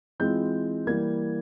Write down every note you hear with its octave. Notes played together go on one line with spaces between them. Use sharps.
E3 G#3 C4 F4 G6
E3 G3 A#3 G#6